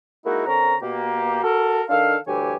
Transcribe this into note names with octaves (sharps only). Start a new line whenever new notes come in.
G#3 A#3 D#4 E4 F#4
D3 C4 C#4 A#4 A#5
B2 A#3 G4
F#4 A4 A#4
D#3 D4 A4 F5
D2 G2 E3 G4 C#5 G#5